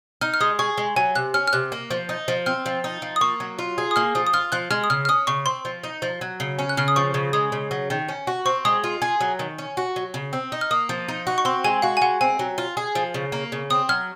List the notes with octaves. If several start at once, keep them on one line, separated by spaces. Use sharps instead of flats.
D#4 F6
F6
G#3 D#6
G#4 C#6
G#3
F#3 G#5
C3 F#6
C#4 F6
F6
C3 F#6
A#3
F3
D#4
F3
C4 F6
F3
D#4
F3
D#6
A#3 C#6
F#3
F4
G#4
D#6
A#3 F6
F3 D#6
D#6
F4 F6
F3 F#6
G#3 F6
D#6
C#3 F6
F6
C#4 D#6
C#3 C#6
C4 C6
F3
D#4
F3
F#3
C#3
C#4
F#6
C#3 F6
D#6
F3 C#6
C#3
G#3 D#6
C#3
F#3
D#3
C#4
F#4
C4 C#6
G#3 D#6
F4
G#4
F#3
D#3
C#4
F#4
F#3
C#3
C4
D#4
F6
A#3 D#6
F3
D#4
F#4
C#6
C4 C6
G#3 G#5
F#4 F5
G#5
G#3 F#5
C4 G#5
F#3
F4
G#4
F3
C#3
A#3
C#3
C4 D#6
F#3 F6